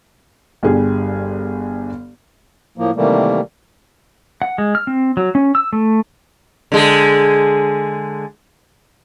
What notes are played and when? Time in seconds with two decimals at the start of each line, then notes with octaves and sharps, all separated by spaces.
0.63 G1 G2 G3 G#4
2.78 A2 F3 A#3
2.96 C3 D#3 E3 G3 A3 A#3
4.42 F#5
4.58 G#3
4.75 F6
4.87 C4
5.17 F#3
5.35 C#4
5.55 E6
5.73 A3
6.72 D3 G#3 G#4